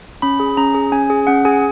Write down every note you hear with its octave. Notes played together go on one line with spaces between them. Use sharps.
C#4 B5
G#4
C#4 A#5
G#4
C#4 G#5
G#4
C#4 F#5
G#4 G#5